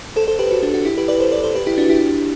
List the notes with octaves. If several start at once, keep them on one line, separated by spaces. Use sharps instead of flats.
A4 C5
A4 C5
G4 B4
F#4 A4
D4 F#4
D4 F#4
E4 G4
G4 B4
B4 D5
A4 C5
B4 D5
A4 C5
G4 B4
E4 G4
D4 F#4
E4 G4